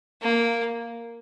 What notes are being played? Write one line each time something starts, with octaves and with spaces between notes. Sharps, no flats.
A#3